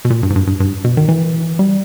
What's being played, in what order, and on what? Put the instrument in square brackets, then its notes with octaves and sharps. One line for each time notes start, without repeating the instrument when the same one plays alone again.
[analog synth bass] B2
A#2
G2
G#2
G2
G2
G2
B2
D#3
E3
G3